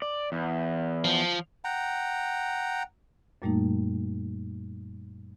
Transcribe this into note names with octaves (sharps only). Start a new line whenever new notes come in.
D5
E2
F3
F#5 G5 A#5
F#2 A#2 G3 A3 A#3 D#4